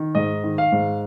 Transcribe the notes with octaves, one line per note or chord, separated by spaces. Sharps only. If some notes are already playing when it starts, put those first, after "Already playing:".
Already playing: D#3
G#2 D#5
D#3
F5
G#2